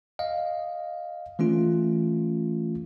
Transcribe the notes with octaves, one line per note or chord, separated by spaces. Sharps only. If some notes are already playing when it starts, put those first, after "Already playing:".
D#5 F5
E3 A3 C#4 F4